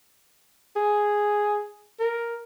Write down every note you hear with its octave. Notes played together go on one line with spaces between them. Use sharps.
G#4
A#4